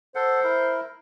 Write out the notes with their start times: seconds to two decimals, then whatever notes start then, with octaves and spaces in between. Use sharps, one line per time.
0.15 A4 C5 F#5
0.44 E4 A#4